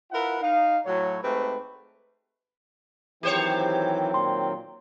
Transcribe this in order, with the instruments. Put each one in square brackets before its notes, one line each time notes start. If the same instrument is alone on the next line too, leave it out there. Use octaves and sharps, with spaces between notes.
[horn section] E4 F4 A#4 B4 E5 F#5
D#4 F5
A2 F#3 C#5
G#2 A3 C4 G4 B4
[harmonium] D#3 F#3 C4 [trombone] E3 [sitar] G4 C5 C#5
[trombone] A#2 [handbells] C6